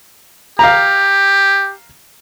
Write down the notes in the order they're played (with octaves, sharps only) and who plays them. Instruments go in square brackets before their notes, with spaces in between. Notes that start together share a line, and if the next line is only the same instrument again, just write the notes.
[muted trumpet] G4 [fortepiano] F5 A#5